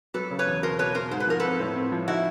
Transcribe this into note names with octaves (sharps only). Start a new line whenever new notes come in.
F#3 A4 B4
C#3
B4 C#5
E2
B2 A#4 C5
B2 B4 C#5
B2 A#4 C5
G#2 C5
B4
F3 A#4
C4 A4 B4
A2
C4
F3
D#4 E4 F#4